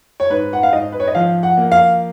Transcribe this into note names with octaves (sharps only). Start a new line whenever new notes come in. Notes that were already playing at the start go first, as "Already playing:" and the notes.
C#5
G#2 B4
F#5
F5
G#2 D#5
B4
C#5
D#5
F3 F5
F#5
A#3
F5